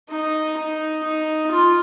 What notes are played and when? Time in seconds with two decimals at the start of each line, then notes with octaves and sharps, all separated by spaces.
0.10 D#4
0.57 D#4
1.03 D#4
1.51 F4